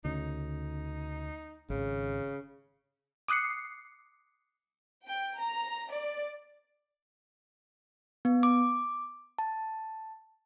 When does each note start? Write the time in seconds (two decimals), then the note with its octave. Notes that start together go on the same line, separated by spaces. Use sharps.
0.05 D2 C#3 D#4
1.70 G#1 C#3
3.28 D6 D#6 F#6 C7 C#7
5.05 G5
5.38 A#5
5.89 D5
8.25 B3
8.43 D6
9.39 A5